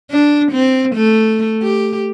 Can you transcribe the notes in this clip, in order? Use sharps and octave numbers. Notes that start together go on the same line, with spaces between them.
D4
C4
A3
G4